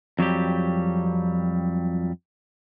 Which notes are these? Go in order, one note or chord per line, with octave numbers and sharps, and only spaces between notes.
F2 F#3 G3 G4